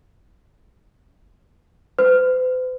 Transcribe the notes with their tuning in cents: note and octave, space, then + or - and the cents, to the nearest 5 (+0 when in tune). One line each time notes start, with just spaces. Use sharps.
C5 -45